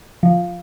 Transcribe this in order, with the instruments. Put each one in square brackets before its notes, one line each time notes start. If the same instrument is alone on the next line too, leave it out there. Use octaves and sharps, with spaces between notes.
[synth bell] F3